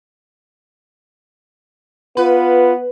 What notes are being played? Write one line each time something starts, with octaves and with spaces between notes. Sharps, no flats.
B3 F4 B4